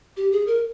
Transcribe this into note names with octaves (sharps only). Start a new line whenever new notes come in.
G4
G#4
A#4